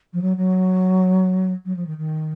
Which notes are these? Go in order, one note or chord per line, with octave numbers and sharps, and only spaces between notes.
F3
F#3
F#3
F#3
F3
D#3
D#3